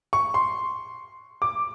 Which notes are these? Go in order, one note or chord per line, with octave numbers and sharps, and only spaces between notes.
C#6
C6
D6